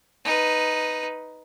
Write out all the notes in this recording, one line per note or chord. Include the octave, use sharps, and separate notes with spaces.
D#4 B4